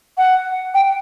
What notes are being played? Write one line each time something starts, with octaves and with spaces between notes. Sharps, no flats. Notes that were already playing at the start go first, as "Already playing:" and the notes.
F#5
G5